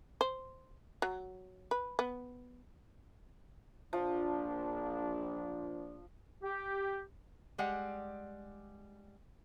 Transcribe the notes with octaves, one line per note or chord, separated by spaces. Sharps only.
C5
F#3
B4
B3
A#1 F3 D4
G4
G3 G#3 G4 D5 F#5